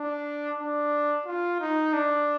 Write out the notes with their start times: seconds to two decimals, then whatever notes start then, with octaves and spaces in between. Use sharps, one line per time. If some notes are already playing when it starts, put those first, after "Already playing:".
Already playing: D4
0.60 D4
1.26 F4
1.60 D#4
1.93 D4